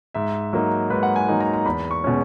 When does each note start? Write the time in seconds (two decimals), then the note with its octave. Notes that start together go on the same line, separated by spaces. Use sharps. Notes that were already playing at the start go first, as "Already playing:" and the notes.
0.14 G#2 E5
0.53 F#3 A#3 D#4
0.90 G#2 B4
1.03 F#5
1.16 G#5
1.29 F#3 A#3 D#4
1.41 A#5
1.54 A#5
1.66 E2 B5
1.91 C#6
2.04 B2 G#3 C#4